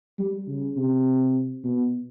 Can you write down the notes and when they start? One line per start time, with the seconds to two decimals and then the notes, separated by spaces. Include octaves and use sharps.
0.19 G3
0.48 C#3
0.77 C3
1.64 B2